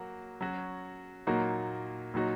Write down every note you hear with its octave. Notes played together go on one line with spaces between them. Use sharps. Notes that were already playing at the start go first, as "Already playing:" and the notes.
Already playing: F#3 A#3 F#4
F#3 C#4 F#4
A#2 F#3 A#3 D#4 F#4
A#2 F#3 D#4 F#4